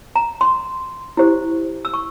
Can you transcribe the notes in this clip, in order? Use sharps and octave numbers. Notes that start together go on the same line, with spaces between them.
A#5
C6
E4 G4 C5
E6
C#6